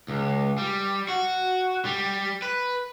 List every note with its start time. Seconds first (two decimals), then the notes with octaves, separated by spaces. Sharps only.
0.08 C#2
0.58 G3
1.09 F#4
1.85 G3
2.42 B4